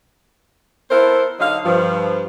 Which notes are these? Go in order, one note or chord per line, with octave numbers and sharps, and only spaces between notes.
B3 E4 A4 A#4 C5
D3 F#3 D#4 F5
G2 F3